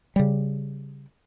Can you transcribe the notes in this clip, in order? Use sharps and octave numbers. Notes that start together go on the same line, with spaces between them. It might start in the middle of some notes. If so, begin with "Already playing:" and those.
C#3 G3